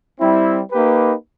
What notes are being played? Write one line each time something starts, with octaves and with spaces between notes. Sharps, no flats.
G3 C4 E4
A#3 D#4 G4 B4